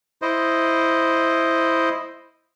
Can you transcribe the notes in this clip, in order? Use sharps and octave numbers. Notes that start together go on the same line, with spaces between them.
E4 C5 D#5